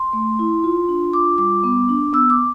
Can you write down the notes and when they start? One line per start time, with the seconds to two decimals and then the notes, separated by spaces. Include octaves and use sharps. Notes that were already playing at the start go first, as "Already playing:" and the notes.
Already playing: C6
0.13 A3
0.39 E4
0.64 F4
0.89 D4
1.13 F4 D6
1.38 G3 D6
1.64 B3
1.89 D4
2.13 B3 E6
2.30 D6